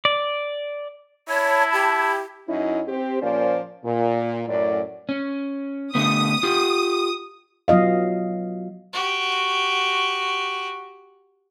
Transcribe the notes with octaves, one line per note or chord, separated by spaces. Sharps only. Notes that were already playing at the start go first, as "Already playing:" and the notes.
D5
E4 C#5 A5 B5 G#6
G4
F#2 C#4 D#4 E4
C4 G4 C5
A#2 F3 A#3 C#4 C5 D5
A#2
F#2 A2 D5
C#4
D3 A3 B3 D#6
F4 G4
F#3 B3 F4 D#5 F5
F#4 G4